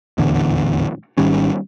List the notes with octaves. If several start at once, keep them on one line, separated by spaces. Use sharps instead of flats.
D#1 A1 E2 D3
G#1 D#3 G3 C#4